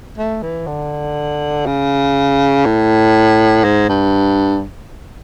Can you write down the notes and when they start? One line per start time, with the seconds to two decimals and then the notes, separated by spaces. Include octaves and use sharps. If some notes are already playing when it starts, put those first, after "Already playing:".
0.18 A3
0.42 E3
0.67 D3
1.66 C#3
2.65 A2
3.64 G#2
3.89 G2